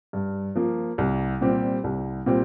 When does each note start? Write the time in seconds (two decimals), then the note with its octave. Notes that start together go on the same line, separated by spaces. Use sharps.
0.13 G2
0.55 F3 A#3
0.98 C2
1.41 A#2 G3 C4 G4
1.84 C2
2.26 A#2 G3 C4 G4